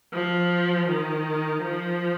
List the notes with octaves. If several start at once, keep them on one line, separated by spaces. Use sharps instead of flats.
F3
D#3
F3